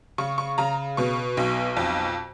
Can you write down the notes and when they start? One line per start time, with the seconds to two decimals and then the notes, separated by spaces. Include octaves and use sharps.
0.18 C#3 C#6
0.38 C#6
0.58 C#3 A#5
0.97 B2 C#6
1.37 B1
1.77 F2